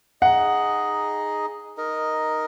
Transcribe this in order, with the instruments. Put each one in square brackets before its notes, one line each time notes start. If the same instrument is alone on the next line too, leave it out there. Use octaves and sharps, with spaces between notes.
[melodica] D#4 G#4 D#5 [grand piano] F#5
[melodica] D#4 A#4 D#5